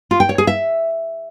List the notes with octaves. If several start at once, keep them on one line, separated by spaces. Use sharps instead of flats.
F4
G5
C#5
G#4
E5